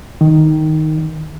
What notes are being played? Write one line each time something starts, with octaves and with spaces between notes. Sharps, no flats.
D#3